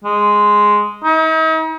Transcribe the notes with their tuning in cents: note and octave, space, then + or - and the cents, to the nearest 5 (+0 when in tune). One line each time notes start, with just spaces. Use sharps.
G#3 +0
D#4 +45